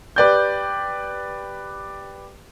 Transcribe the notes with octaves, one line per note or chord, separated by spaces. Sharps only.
G4 B4 D5 G6